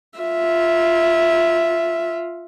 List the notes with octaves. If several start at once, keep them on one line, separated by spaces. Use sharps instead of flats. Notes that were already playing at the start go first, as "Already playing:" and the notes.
F4 E5